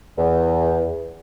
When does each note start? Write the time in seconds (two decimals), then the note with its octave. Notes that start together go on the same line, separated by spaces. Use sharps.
0.18 E2